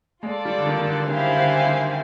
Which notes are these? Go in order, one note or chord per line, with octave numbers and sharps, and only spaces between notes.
G#3 F4 A4 D5
G3
D3
D#3
D#3
D3
C#3 E4 G4 C5 F5 G#5
D3
D#3